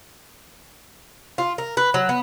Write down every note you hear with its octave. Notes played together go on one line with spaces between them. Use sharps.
F4
A#4
B4
F#3
B3